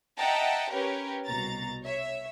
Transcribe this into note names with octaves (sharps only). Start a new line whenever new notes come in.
D#5 E5 F#5 G5 A5 A#5
C#4 G4 A#4 B4 C#5
C2 B2 A#5 A6
C#5 E5